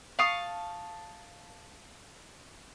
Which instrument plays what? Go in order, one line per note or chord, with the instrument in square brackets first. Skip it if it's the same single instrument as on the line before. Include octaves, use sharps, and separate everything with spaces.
[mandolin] F5 A5 C#6 D#6